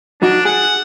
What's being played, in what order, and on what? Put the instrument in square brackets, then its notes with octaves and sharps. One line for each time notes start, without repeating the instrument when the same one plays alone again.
[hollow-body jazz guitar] F#3 D#4 F#4 [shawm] D4
[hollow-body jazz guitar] G#4 [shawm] F#5